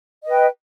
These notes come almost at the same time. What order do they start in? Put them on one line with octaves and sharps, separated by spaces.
D#5 B4 G5